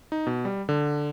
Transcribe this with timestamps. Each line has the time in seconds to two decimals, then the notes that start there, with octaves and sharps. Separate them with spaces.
0.12 D#4
0.27 B2
0.45 G3
0.69 D3